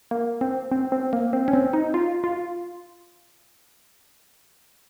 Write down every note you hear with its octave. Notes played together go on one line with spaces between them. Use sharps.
A#3
C4
C4
C4
A#3
C4
C#4
C4
D#4
F4
F4